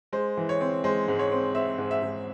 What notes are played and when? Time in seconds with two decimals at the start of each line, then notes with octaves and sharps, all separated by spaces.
0.13 G#3 C5
0.37 E3
0.49 C#5
0.61 C4
0.84 G#3 C5
1.08 G#2
1.19 C#5
1.31 C4
1.55 C4 E5
1.78 G#2
1.91 E5
2.02 G#2